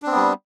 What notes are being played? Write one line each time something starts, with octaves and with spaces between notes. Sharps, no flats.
G3 B3 C4 D4